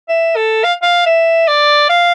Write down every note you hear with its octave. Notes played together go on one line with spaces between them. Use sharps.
E5
A4
F5
F5
E5
D5
F5